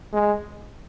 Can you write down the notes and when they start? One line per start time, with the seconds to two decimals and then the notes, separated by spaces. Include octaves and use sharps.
0.13 G#3